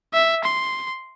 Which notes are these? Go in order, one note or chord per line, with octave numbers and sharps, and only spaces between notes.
E5
C6